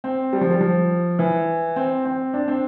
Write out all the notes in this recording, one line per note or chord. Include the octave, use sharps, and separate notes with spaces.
C4
G3
F3
G3
F3
E3
C4
C4
D4
C4